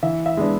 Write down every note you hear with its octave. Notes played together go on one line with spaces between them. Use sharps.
E3 E5
E5
G#3 B3 D4